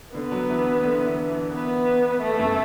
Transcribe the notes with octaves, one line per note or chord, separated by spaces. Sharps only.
D3 B3
F#3
E3
D3
E3
E3
B3
A3
E2
F#2